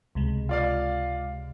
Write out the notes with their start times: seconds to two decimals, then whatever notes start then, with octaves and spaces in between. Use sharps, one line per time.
0.15 C#2 C3 G#3
0.49 F4 D5 F5